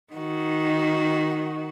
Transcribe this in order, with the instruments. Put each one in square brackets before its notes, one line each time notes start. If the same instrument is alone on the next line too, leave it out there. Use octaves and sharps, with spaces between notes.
[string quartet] D#3 F#4